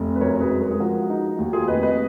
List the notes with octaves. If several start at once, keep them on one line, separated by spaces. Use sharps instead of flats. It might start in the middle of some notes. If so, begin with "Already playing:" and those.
Already playing: F1
B4
F#2 A#4 C#5
G#4 B4
G#3
A#4
G#4
F3 F#4 A#4
D#4
D#2 F#4
F4 G#4
F1 B4 D#5
B4 D#5